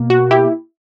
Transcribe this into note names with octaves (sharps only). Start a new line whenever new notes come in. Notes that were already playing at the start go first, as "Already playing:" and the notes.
Already playing: B2 A#3
F#4
E4 G4